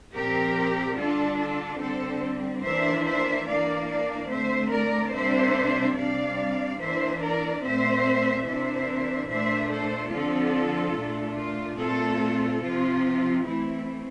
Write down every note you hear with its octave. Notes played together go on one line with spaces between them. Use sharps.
A#2 F3 C4 G4 A#4
D3 G3 D4 F4 A4
F4 A4
D3 G3 C4 A4 C5
E3 A#3 D4 C5 E5
C5 E5
E3 A#3 D4 D5 F5
D5 F5
D3 A3 C4 C5 E5
A#4 D5
C3 G3 A#3 D4 C5 E5
C3 G3 D4 D5 F5
E3 A#3 D4 C5 E5
A#4 D5
A#2 A3 C4 C5 E5
C3 E3 A#3 D4 C5 E5
A#2 A3 D4 C5 E5
A4 C5
D3 F3 C4 F4 A4
A#2 A3 D4
F4
A#2 A3 C4 F4 A4
C3 F3 C4 F4
E3 A3 C4 E4